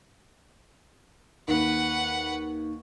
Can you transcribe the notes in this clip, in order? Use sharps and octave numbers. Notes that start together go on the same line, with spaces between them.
D#2 B4 F#5